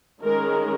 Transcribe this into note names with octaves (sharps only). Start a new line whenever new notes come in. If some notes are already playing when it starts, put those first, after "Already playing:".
D#3 G#3 C#4 A#4